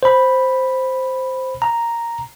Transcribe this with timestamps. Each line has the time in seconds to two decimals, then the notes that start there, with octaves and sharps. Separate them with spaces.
0.03 C5 B5
1.62 A#5